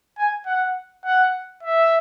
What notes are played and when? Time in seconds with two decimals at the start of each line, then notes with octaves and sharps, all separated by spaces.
0.18 G#5
0.46 F#5
1.05 F#5
1.63 E5